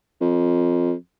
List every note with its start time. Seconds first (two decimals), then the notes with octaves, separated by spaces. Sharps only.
0.21 F2